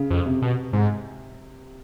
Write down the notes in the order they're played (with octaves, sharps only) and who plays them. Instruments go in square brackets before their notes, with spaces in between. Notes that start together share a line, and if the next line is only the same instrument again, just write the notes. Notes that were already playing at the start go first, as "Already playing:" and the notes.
Already playing: [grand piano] C#3
[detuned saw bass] F2
[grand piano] C3
[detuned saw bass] B2
G#2